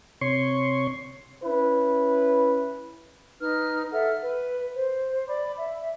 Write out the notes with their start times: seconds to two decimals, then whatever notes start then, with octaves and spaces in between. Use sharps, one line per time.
0.21 C3 C#5 C6 C#6
1.43 C#4 E4 B4
3.40 D#4 B4 F6
3.91 A4 E5 F#5 F6
4.21 B4
4.76 C5
5.28 D5 B5 D6
5.57 E5